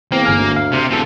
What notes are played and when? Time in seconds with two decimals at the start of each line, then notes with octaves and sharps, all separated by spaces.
0.12 E2 A#3 C4
0.25 G1 G#5 F6
0.38 D2
0.56 F5
0.72 C3
0.90 E1 C3 A4